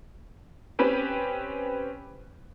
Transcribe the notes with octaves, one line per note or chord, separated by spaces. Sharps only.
C4 C#4 G4 B4